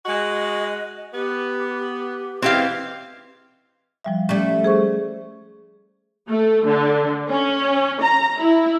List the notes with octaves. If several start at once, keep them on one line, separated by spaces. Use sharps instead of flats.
G#3 F#4 D#5
B3 G4
E2 G#2 E3 C4 G4 B4 F5
F3 G3 E5
G3 A3 C#4
G#4 C5 C#6
A3
D3
C#4
A#5
E4